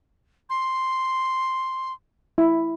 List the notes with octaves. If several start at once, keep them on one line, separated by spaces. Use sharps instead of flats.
C6
E4